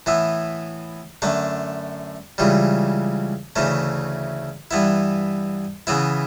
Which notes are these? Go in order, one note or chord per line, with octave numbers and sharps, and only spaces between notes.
A2 E3 B3 E4
F#2 D3 A3 D4
C#2 C#3 E3 G3
D2 C#3 E3 A3 C#4
G2 E3 B3 E4
C#3 E3 B3 E4